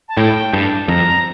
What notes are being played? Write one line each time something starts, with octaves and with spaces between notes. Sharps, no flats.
A5
A2 G5
G2 A5
F2 A#5